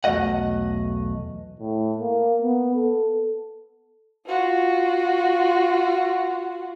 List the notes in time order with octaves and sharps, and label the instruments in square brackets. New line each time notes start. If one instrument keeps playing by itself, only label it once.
[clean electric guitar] B1 E2 A3 F#4 D#5 F#5
[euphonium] A2
A#3
B3
A4
[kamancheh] F4 F#4